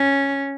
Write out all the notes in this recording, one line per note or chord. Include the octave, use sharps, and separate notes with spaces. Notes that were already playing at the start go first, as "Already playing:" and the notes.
Already playing: C#4